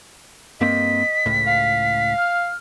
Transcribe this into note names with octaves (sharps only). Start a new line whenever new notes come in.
G2 A#3 C4 D#5 B6
C#2 A2
F5
F6